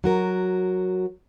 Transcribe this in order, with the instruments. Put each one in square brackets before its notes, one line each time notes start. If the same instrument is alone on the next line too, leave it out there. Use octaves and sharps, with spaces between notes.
[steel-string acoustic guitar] F#3 F#4 A#4